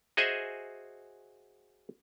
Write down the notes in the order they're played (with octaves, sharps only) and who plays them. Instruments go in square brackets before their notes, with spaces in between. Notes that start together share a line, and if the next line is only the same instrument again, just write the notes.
[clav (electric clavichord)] F#4 G#4 C5 D#5 E5 G#5